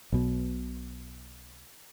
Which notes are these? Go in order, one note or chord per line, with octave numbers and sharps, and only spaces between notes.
B1 B2